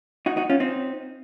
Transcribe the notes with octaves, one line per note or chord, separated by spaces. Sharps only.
D#4 F#4
D#4 F#4
C#4 F4
C4 D#4